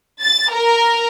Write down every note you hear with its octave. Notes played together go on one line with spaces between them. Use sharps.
A6
A#4